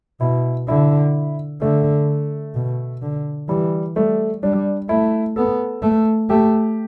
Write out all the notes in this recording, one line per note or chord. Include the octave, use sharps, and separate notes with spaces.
B2 E4
D3 E4
D3 A3
B2
D3
E3 G3
G3 A3
G3 D4
A3 E4
B3 A4
A3
A3 G4